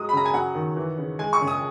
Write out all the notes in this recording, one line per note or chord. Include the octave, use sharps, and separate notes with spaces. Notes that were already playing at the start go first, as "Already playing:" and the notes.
Already playing: F#3 G#3 D#6
B5
C#3 A#5
G#5
F#3 F#5
D#3
E3
C#3
G#3 G#5
C#6
C#3
D#6